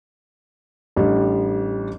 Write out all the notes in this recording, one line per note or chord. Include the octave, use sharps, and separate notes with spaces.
A1 G3 D4